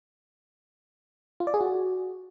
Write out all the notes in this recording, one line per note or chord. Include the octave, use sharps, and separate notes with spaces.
F4
D5
G#4
F#4